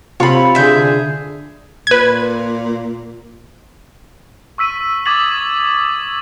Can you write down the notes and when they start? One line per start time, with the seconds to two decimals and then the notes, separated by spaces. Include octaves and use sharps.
0.20 C3 C4 F4 C#5 B5
0.55 D3 G#4 E5 G6
1.87 A#2 B4 G#6
4.58 C#6 E6 B6 D#7
5.06 D6 D#6 G#6 A6 B6 F#7